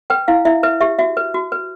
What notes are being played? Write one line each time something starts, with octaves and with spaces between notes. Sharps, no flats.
B4 G5
E4 F5
E4 E5
B4 E5
G4 E5
F#4 E5
B4
F#4
B4